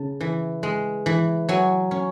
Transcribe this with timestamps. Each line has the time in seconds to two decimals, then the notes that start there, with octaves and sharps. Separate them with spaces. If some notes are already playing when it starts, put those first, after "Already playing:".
Already playing: C#3 A5
0.21 E3
0.63 G#3
1.06 E3
1.49 F#3 G#5
1.91 C#4